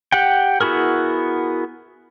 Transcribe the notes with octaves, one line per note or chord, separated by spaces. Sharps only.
G4 F#5 G5
B3 E4 F#4 G#4 A#4